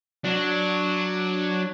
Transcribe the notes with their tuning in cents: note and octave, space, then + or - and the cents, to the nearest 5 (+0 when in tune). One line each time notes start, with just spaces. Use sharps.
F#3 -5 D4 +0